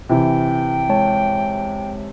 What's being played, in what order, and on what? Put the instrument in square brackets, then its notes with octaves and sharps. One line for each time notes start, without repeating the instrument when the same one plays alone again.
[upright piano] C3 E3 [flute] G5
[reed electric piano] G#3 C#5 A5